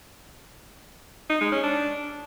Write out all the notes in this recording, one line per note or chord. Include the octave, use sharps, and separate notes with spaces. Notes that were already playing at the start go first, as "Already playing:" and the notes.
D#4
G#3
C#4
D4